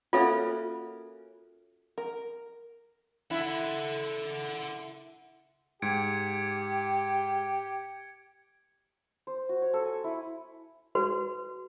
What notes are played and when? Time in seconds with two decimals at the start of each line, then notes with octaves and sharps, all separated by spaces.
0.13 A#3 C#4 F4 F#4 A4 E5
1.98 A#4
3.31 E4 A4 F#5
5.82 G#2 G4 G#6 C#7 D7
9.27 C5
9.49 F#4
9.62 C#5
9.74 A4
9.85 G#5
10.04 E4
10.95 F#4 B4